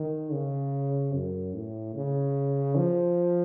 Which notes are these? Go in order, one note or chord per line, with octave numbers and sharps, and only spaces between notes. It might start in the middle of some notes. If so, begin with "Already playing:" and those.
Already playing: D#3
C#3
F#2
A2
C#3
F3